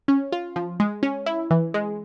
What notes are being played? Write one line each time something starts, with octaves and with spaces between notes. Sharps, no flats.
C#4
F4
F3
G#3
C#4
E4
E3
G#3